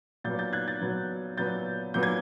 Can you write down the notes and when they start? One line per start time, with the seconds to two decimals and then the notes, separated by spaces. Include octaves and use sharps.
0.24 A#2 F#3 B3 G6 A6
0.39 G6 A6
0.53 F#6 G#6
0.67 G6 A6
0.81 A#2 F#3 B3
1.37 A#2 F#3 B3 G6 A6
1.94 A#2 F#3 B3 G6
2.03 G#6